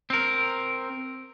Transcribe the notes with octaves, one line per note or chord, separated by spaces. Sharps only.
C4 A#4